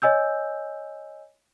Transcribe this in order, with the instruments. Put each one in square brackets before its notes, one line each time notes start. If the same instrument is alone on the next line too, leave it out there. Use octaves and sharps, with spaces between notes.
[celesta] C#5 D#5 G#5 E6 G6